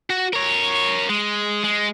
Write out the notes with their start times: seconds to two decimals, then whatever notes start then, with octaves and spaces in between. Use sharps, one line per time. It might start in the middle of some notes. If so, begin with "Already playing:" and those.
0.10 F#4
0.33 A#4 C#5
1.10 G#3
1.64 G#3